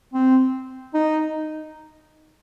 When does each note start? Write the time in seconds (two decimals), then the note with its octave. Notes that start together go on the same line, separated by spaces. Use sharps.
0.14 C4
0.94 D#4